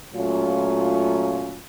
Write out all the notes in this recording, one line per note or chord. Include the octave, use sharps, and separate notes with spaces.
A#2 F#3 A3 C#4 F4